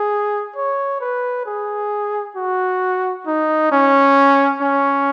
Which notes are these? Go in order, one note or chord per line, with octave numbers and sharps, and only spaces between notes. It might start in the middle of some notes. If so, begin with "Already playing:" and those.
Already playing: G#4
C#5
B4
G#4
F#4
D#4
C#4
C#4